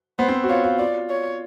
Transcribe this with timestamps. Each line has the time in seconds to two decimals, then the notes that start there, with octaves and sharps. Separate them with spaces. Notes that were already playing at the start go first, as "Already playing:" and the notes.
0.19 B3 C5
0.28 C4
0.44 F#4
0.49 F4 C#5
0.64 F4
0.79 F4 D5
1.10 C#5